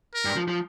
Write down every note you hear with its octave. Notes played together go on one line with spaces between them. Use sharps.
A#4
G2
F3
F3